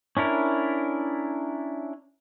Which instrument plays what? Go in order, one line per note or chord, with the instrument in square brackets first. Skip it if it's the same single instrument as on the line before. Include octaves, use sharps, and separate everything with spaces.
[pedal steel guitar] C#4 D4 E4 A#4